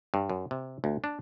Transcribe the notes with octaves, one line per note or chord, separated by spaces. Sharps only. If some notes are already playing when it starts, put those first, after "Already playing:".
G2
F#2
C3
D2
D4